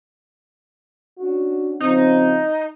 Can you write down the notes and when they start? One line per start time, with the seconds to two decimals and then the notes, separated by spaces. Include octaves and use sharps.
1.19 C#4 D4 F#4
1.80 C#3 F3 C4 D#4